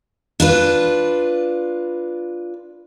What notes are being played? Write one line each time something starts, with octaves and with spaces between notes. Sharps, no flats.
D4 F4 B4